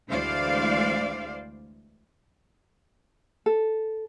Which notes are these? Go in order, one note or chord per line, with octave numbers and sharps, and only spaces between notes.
D2 E3 G#3 C5 D5 F5
A4